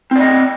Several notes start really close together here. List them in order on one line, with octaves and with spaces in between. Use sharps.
C4 D5 D#5